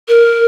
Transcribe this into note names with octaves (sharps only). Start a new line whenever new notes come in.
A#4